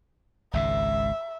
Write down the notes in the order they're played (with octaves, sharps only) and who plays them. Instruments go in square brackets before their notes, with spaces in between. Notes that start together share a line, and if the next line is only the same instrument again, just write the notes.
[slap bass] G#1 C#2 G#2 [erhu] E5